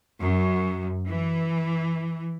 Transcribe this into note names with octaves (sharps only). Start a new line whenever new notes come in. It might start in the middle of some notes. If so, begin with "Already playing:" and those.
F#2
E3